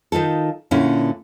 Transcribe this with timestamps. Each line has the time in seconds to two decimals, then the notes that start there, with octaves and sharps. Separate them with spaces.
0.12 D#3 D#4 F4 A4
0.71 A#2 D3 C#4 E4